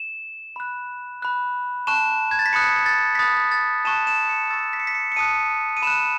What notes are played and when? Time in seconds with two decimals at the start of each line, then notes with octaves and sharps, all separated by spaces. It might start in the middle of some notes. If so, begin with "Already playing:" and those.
Already playing: E7
0.56 B5 F#6
1.22 B5 F#6
1.87 A5 C#6 F#6 E7
2.31 G#6
2.39 A6
2.46 B6
2.53 B5 D#6 F#6 C#7
2.86 A6
3.15 B6
3.19 B5 D#6 F#6 A6
3.52 A6
3.85 A5 C#6 F#6 E7
4.07 E7
4.29 C#7
4.50 A5 C#6 E6 A6
4.73 B6
4.80 C#7
4.87 B6
4.95 C#7
5.12 C#7
5.16 A5 D#6 F#6 D#7
5.77 D#7
5.82 B5 F#6 E7